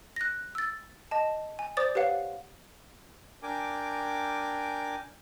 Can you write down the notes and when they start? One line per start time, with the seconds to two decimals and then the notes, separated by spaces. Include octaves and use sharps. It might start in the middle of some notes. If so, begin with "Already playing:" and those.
0.16 F#6 A#6
0.55 E6 A6
1.11 D#5 A5
1.59 G#5
1.77 C5 D5 D6 D#6 A6
1.95 G4 B4 C#5 F5 F#5
3.43 D4 A#4 G5 G#5 D6